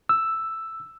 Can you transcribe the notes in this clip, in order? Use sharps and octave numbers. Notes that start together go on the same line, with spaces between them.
E6